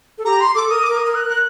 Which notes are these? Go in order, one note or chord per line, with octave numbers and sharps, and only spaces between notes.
A4
G4 A#5
C6
A4 D6
A#4 D#6
D6
A#4
D#6
A#4
F#6
A#4
F#6